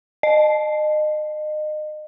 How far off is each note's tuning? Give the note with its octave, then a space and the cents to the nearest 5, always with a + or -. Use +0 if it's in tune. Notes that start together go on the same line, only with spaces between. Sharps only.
D#5 -30